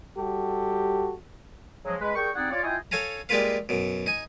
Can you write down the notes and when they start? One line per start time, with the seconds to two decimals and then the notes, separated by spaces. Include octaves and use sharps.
0.18 G3 F#4 G4 A4
1.85 C#3 F3 F#3 G#3
2.00 G#3 B4
2.15 G3 G#4 A#4 G5 C#6
2.34 G3 C4 D#4 G#4 D5 F#5
2.50 F4 C#5 D5
2.63 E4 F4 D#5 G5 G#5
2.91 A4 C#5 F5 G#5 A#5
3.29 G3 G#3 A#3 F4 B4 F5
3.69 F#2 B2
4.06 D#4 G#5